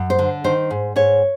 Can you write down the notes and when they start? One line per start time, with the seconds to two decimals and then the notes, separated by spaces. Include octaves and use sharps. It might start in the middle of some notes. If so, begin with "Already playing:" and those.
Already playing: F#2
0.10 C5
0.19 D3
0.44 D#3 C5
0.71 G#2
0.96 G#2 C#5